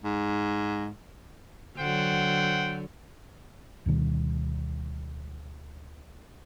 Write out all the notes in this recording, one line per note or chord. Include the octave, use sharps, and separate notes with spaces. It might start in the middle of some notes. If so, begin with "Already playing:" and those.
G#2
D3 F#3 C5 F#5 G5
D2 B2 D#3 G3